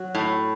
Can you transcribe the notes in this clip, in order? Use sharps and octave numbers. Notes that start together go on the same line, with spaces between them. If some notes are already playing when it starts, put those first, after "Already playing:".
Already playing: F#3 F#4
A2